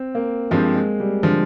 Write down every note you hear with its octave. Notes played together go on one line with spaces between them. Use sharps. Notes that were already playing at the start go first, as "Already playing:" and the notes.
Already playing: C4
A#3
G2 F3 G#3 C4 G4
G#3
G3
D3 F3